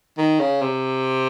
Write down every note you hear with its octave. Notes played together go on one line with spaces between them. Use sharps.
D#3
C#3
C3